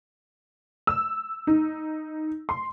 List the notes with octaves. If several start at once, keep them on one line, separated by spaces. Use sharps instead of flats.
E6
D#4
C6